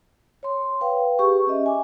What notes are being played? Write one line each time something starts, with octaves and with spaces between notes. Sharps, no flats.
C#5 C6
B4 F5 G5
G4 G#4 C#6
C#4 G4 D#5 E5
G#5 D6